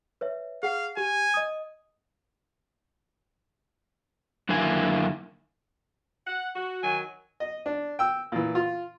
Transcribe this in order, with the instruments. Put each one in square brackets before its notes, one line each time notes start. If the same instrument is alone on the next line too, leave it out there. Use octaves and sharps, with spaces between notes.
[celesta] B4 C#5 E5
[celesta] G#4 F#5 [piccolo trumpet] F5
[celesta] G4 [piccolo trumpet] G#5
[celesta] D#5 D#6
[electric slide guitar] F#2 D3 D#3 A#3 E4 G#5
[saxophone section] F#5
F#4
[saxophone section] D#3 F#3 [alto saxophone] G#5
[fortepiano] D#5
D4
G5 E6
A#2 E3
F4